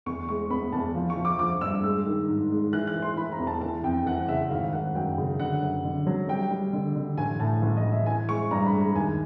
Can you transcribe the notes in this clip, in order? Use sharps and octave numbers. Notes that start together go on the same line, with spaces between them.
E2 C#6
G#3 C#6
B3 B5
E2 A5
F3
C#6
F3
D6
F3 D6
G2 E6
G#3 E6
D#3
G#2
G#3
E3 F#6
F#6
E3
C6
E3 B5
A#5
E2
A5
E3 A5
F2 G5
E3 F#5
C#3 E5
G#1 F5
G#1 F#5
F#2 G5
C#3
D3 F#5
F#2
D3
F#3
G3 G5
G3
D3
D3
A1 G#5
A2 A5
A1
D#5
A1
E5
E3 G#5
G#3 C#6
G2 A#5
B5
G#3
A#5
D#2 G#5